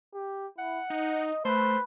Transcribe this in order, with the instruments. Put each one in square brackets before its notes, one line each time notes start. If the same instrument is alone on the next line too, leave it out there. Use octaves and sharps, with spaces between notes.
[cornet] G4
[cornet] E4 [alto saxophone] F#5
[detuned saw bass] D#4 [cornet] D#5
[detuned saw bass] A3 [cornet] B4 [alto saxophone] C5